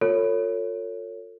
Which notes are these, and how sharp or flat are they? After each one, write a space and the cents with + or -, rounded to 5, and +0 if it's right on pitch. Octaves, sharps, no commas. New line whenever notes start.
F4 +40 A4 +45 C#5 +0